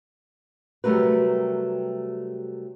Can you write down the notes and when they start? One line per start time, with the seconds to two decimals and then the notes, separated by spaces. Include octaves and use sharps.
0.84 C3 F#3 G3 A3 A#4 B4